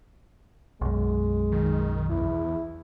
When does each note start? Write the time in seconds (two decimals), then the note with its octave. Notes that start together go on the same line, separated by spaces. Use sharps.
0.81 B1 F#2 G#3
1.52 D#3
2.10 E2 E4